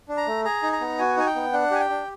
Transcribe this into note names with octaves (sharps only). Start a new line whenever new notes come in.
D4
A#5
A3
G#4 A#5
D#4
A#5
B3
F#4 G#5
D#4 G#5
G5
B3
D4 F#5
G4 G#5
G5
D4